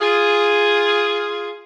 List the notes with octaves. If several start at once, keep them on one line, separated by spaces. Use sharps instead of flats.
F4 G#4